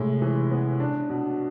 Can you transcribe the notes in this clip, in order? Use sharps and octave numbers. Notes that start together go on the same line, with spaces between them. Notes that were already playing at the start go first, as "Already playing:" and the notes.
Already playing: A2 C3 G#3
E3
B3
D4
B2